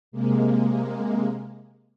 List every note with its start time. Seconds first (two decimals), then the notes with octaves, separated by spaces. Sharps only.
0.12 C3 G#3 A#3